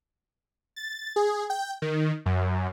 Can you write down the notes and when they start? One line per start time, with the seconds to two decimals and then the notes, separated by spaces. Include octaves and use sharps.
0.76 A6
1.16 G#4
1.50 G5
1.82 D#3
2.26 F#2